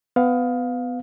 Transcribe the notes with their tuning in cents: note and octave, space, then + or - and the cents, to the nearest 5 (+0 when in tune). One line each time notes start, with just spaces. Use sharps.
B3 +20 F5 +20